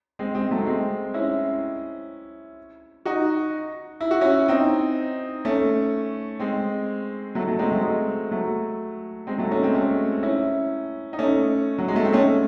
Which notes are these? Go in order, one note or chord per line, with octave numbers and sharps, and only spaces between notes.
G#3 C4
G#3 C4
F#3 A3
G#3 C4
C#4 E4
D#4 F#4
E4
F#4
C#4 E4
C4 D#4
A3 C#4
G#3 C4
F#3 A3
F#3 A3
G#3 C4
F#3 A3
G#3
F#3 A3
G#3 C4
F#3 A3
A3 C#4
G#3 C4
A3 C#4
C#4 E4
D#4
A3 C#4
F#3
G#3
A3
C4
A3 C#4